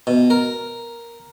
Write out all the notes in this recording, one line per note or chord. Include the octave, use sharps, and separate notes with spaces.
B2
A#4